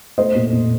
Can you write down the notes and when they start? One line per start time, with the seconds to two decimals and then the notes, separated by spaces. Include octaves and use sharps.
0.18 A3 C5 D#5
0.35 A#2
0.52 A#2